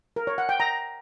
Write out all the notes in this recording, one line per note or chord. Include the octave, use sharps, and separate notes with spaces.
A#4
C#5
F#5
G5
A#5